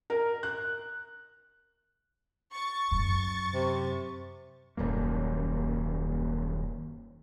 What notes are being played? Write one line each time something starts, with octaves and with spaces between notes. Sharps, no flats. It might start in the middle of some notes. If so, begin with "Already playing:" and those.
A#4
F#6
C#6 A6
F#2
C3
D#1 F#2 A#3